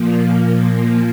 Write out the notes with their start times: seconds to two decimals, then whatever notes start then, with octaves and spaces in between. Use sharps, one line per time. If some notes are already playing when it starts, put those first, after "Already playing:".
Already playing: A#2 F3 A#3